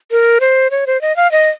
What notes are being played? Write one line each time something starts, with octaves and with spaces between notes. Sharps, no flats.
A#4
C5
C#5
C5
D#5
F5
D#5